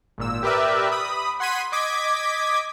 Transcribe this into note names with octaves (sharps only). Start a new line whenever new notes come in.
G#1 A#2 E6
G4 A#4 B4 D5 E5
B5 D#6
F#5 C6 G#6 B6 D#7
D#5 D6 G#6 B6